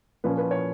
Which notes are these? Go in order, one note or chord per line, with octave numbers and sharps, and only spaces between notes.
A#2 F3 A#3 C#4 B4
B4
C#5